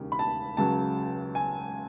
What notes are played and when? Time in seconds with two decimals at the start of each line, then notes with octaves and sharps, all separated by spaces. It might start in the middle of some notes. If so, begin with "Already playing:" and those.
Already playing: E1 D#2 C#3
0.12 B5
0.19 A5
0.57 C#2 C#3 F#3 A5
1.35 G#5